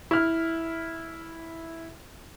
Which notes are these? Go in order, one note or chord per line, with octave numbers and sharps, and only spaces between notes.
E4 F6